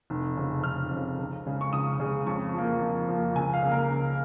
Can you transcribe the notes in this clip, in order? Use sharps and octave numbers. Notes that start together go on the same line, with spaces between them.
F1
F2 C#3
F1 F6
F2 C#3
C#2
C#3 G#3
C#6
C#2 D#6
C#3 G#3
F2 C#6
F3 A#3
F2
F3 A#3
C#2 G#5
F5
C#3 A#3
A#4
C#2